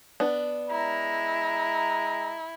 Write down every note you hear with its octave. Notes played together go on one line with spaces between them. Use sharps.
B3 D4
G#3 E4 A#5